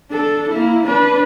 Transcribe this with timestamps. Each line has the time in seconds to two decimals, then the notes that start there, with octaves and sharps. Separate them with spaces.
0.11 D4 A4
0.50 A#3 E4
0.86 D4 B4